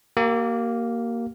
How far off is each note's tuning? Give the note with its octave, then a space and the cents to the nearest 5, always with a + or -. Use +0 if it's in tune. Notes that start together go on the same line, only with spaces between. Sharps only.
A#3 +0 G4 -35